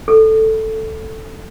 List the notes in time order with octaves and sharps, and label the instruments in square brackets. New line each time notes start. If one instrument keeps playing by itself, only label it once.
[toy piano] A4